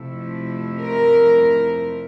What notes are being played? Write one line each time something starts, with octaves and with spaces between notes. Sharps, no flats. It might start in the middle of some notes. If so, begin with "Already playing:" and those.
Already playing: F2 C3 F3 A3 E4
A#4